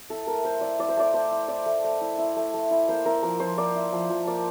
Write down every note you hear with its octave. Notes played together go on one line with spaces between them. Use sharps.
E4 A4
A3 A#4
A3 C5
E4 D5
E4 D5
C5
A3 D5
A3 C5
E4
E4 D5
A3
A3
E4
E4
A3
A3
E4
A#3 C5
E4 A#4
F3 A#4
F3 C5
A#3 D5
E4
F3
F3
A#3 D5